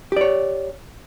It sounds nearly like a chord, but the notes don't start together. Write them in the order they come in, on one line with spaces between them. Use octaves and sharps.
G4 D5 C#5